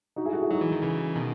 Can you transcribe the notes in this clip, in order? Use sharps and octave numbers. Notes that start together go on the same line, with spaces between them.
D#4 F#4
E4 G#4
F#4 A4
E4 G#4
F#3 D#4 F#4
E3
D#3
C#3 E3
B2 D#3